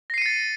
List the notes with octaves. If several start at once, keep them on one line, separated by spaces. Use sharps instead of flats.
A6 A#6 C7 C#7 D#7